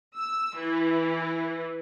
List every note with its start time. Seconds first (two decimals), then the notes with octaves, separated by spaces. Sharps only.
0.16 E6
0.57 E3